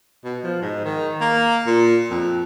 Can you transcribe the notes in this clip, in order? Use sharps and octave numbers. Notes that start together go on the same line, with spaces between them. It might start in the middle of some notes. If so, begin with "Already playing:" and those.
B2
F3
G#2
D#3
A#3
A#2
F2